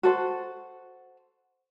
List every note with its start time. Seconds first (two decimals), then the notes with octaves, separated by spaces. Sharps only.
0.03 F#4 A4 C5